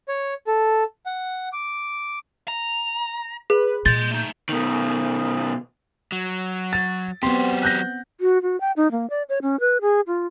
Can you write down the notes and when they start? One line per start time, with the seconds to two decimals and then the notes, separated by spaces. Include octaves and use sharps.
0.08 C#5
0.47 A4
1.06 F#5
1.53 D6
2.48 A#5
3.50 G#4 B4
3.86 A#2 D#5 C6 G6 A6
4.11 A3 D#4
4.49 B2 D#3
6.12 F#3
6.73 A6
7.23 F#3 B3 C4 G4 C6
7.63 F#6 G6 A#6
8.21 F#4
8.42 F#4
8.61 G5
8.76 D#4
8.92 A#3
9.10 D5
9.29 C#5
9.42 C#4
9.60 B4
9.81 G#4
10.07 F4